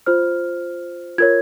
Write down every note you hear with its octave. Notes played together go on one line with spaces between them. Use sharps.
F4 C5 F6
F4 A#4 C#5 G#6